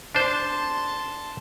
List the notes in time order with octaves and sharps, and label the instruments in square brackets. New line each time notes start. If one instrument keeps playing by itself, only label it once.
[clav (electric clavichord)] D4 C5 [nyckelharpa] A5 C6